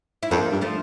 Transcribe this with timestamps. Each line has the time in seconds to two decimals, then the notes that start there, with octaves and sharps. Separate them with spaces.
0.23 E4
0.31 F2 A#3 D4
0.52 G2
0.61 F3 A3